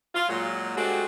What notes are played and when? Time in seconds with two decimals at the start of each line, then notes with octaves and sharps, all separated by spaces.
0.15 F4
0.28 A#2 F#3 G#3
0.77 G#3 A3 C4 D4 F#4 G4